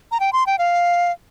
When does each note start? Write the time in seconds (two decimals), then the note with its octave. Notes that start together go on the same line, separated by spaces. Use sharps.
0.12 A#5
0.20 G5
0.33 C6
0.46 G5
0.58 F5